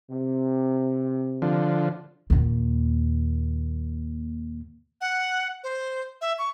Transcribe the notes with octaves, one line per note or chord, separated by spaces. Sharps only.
C3
D3 F3
D#2 A#2
F#5
C5
E5
C#6